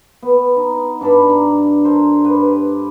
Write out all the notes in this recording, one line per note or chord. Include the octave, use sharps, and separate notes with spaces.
B3
D#4
G2 D4 A5 B5
A#5
A4 A#4 C5
G2 G4 B4